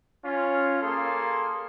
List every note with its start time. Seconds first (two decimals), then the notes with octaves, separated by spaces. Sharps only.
0.24 C#4 F4
0.82 A#3 G#4 A4 C6